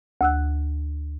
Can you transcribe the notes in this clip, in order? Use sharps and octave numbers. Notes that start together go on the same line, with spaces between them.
D2 E6 F#6